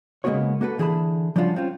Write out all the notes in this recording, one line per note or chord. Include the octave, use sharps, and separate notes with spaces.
C#3 G#3 A#3 B3 F#4 C#5
A#3 F#4 A4 B4
D3 E3 G#4 C5 A5 B5
F3 G3 C#4 D4 F4 F#4
C4 C#4 F4